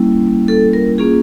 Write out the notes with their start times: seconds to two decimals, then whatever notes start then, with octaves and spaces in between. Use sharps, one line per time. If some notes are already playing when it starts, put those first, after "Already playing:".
Already playing: G3 A#3 C#4 E4
0.48 A4
0.73 A#4
0.98 A#3 C#4 F4 G#4